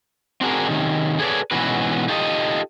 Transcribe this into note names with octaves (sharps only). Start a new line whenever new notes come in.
C4 D4 F#4 G#4 A#4
C3 D#3 C#4
G#4 A4 B4 C#5 D5
G#2 B2 E3 C#4 F#4 B4
D#4 F4 G4 A4 B4 D#5